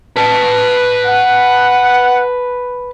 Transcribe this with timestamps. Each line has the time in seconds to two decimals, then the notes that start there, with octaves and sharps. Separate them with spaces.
0.17 B4 A5
1.06 F#5